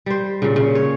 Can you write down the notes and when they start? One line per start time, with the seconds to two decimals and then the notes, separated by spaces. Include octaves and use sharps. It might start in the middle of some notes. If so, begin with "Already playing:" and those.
0.06 G3 C5
0.42 A#2 C#3
0.56 C#3
0.75 C#5